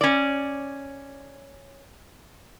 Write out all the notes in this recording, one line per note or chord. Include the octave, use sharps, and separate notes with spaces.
C#4 D5